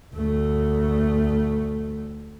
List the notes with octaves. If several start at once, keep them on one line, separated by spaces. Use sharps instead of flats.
D2 A3